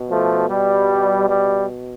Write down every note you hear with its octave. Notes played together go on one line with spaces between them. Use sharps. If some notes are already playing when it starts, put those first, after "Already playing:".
Already playing: B2
F3 A3
G3
G3